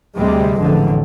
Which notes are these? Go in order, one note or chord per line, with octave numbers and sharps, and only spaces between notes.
D2 C3 G3 G#3
A1 F2 D3